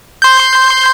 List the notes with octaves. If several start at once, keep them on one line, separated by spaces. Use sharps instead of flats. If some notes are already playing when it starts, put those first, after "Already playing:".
C6 G6